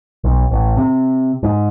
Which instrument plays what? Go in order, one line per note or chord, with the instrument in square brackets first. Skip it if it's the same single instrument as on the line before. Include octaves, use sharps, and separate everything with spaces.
[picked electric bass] B1
A1
C3
G#2